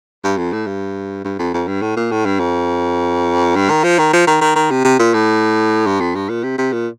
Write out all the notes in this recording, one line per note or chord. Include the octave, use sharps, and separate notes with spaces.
G2
F2
A2
G2
G2
F2
F2
G2
A2
A#2
A2
G2
F2
G2
D#3
F3
D#3
F3
D#3
D#3
D#3
C3
C3
A#2
A2
G2
F2
G2
A#2
C3
C3
A#2